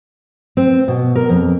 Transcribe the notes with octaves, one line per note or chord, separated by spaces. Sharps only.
C4
B2
A#4
F2